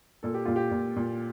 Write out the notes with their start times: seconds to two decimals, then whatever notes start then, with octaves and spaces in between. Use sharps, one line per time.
0.23 A#2 A4
0.34 G4
0.45 A#2 F4
0.56 G4
0.71 A#2
0.96 A#2